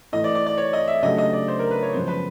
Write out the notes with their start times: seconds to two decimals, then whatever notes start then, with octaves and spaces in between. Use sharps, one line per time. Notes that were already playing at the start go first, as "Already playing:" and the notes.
0.12 A2 E3 A3 D#5
0.24 D5
0.35 D5
0.46 D5
0.58 C#5
0.73 D#5
0.87 E5
1.02 C#3 F#3 A3 D4 G4 D#5
1.18 D#5
1.33 D5
1.48 C5
1.59 A#4
1.71 B4
1.83 C#5
1.93 F#2 C#3 F3 G#3 B3 C5
2.08 B4